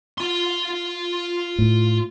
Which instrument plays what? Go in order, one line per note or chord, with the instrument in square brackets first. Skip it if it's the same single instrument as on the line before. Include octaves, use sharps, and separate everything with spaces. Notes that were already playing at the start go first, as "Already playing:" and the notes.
[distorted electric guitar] F4 C6
[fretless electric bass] A2